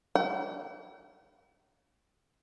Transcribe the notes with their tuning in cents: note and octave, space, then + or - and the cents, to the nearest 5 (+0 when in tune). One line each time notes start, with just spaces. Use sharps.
F#5 +45